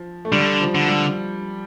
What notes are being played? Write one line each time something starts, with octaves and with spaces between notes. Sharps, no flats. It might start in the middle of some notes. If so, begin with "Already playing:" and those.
Already playing: F3
A3
D3 G3
F3
D3
G3